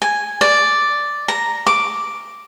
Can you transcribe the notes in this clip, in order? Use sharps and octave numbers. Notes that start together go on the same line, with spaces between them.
G#5
D5
A#5
D6